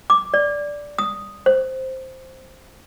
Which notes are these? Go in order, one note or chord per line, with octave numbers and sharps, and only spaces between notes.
D6
D5
D#6
C5